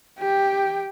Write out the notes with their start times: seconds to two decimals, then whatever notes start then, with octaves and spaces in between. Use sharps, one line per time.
0.19 G4 G5